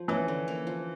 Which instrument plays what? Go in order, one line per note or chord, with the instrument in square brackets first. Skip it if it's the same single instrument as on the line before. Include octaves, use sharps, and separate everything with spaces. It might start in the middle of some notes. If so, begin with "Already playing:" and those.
Already playing: [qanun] F3
[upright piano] E3 [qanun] C#4
[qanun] D3
A#3
F3